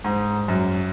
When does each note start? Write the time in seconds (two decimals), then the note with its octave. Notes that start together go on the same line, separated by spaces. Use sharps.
0.04 G#2
0.48 F#2